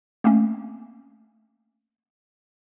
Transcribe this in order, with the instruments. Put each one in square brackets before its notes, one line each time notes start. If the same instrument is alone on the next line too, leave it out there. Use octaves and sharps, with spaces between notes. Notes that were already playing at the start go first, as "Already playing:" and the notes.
[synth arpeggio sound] A3 A#3 C4 C#4